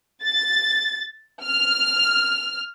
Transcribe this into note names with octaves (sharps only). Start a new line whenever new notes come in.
A6
F6